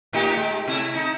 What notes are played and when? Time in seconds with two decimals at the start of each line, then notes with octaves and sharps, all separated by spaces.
0.13 A2 D#4 G4
0.36 G#3
0.68 C3 A3 E4
0.95 D#4